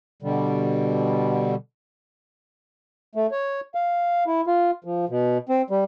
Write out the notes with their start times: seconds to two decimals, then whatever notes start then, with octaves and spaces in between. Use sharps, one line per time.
0.22 B2 D3 G3
3.15 A3
3.31 C#5
3.75 F5
4.27 E4
4.47 F4
4.84 F3
5.09 B2
5.49 C4
5.70 G3